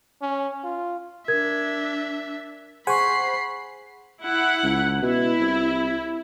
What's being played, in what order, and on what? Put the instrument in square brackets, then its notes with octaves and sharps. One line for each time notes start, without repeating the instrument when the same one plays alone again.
[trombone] C#4
F4
[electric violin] D4 E5 [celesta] A#4 G#6
[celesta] G#4 C#6 [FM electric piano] C5 F#5 G#5 [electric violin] B5 C7
[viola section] E4 F#5
[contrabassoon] C#2
[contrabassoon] B2 [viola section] E4
[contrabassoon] C2